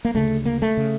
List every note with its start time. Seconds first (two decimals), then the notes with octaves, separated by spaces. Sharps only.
0.05 A#3
0.14 D2 C#3 A3
0.45 A#3
0.62 A3
0.77 C#3